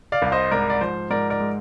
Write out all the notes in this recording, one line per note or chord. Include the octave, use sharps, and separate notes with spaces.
D5 F5
C2
C5 D#5
G#2 A#4 D5
D5
F3 C5
G#2 A#4 D5
A#4 D5
G#3